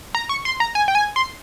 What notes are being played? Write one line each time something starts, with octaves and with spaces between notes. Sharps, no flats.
A#5
C#6
C6
A#5
G#5
G5
G#5
C6